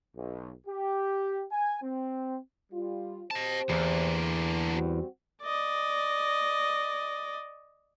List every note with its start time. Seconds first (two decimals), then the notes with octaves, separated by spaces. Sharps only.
0.16 B1
0.67 G4
1.52 G#5
1.82 C4
2.72 G3 F4
3.31 C4 G4 C5 D#5 A5
3.70 E2 D3 A#3
4.74 G3 C4 F#4
5.43 D5 D#5